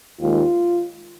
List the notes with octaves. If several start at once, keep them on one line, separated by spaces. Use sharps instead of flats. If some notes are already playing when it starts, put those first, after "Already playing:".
D#2 D#3 G#3 F4